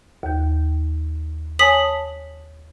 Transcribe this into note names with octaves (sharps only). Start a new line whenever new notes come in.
D#2 G6
C#5 G#5 A5 D#6 B6 F#7